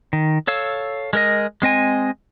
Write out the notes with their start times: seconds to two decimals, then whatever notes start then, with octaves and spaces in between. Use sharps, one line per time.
0.13 D#3
0.47 A4 C#5 F5 E6
1.13 G#3 A#4 D#5
1.62 G#3 C4 D#5 G#5